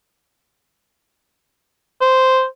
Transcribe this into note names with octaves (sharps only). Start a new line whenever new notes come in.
C5